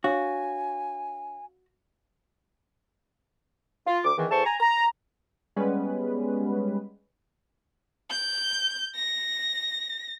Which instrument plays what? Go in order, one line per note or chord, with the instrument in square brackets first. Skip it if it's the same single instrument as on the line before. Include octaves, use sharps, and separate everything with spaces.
[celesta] D4 C#5 F5 [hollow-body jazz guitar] F#4 [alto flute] G#5
[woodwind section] F4
D2 D6
E2 D#3 E3
E2 E3 A4 C5 A5 C#6
G#5 A#5
A#5
[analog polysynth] G3 G#3 B3 C#4 B4
[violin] G6
A#6